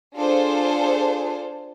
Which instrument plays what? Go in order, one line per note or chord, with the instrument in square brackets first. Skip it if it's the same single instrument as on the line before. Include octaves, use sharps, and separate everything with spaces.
[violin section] D4 F4 G#4 A4 C5